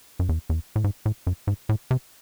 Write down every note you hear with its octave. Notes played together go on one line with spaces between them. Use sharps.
F#2
E2
E2
A2
G#2
A2
F#2
G#2
A2
C3